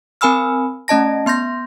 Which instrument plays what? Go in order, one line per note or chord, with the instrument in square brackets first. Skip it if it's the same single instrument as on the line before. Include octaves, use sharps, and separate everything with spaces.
[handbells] C4 A#4 G#5 B5 E6 F6
A3 C#4 D#5 A5 A#6
B3 C6 G6 A#6